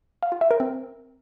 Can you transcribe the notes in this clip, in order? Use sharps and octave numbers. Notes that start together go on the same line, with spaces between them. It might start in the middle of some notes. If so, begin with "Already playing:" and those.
F5
F4
E5
A#4
C4